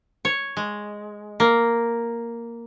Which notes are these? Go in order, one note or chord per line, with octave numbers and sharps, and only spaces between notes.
C#5
G#3
A#3